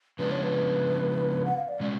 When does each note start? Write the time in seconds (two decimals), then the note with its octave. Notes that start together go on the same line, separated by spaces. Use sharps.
0.19 C#3 F3 G#3 B3 D4 B4
0.31 C#5
0.43 B4
1.45 F#5
1.57 F5
1.68 D5
1.80 B2 G#3 C#4 D5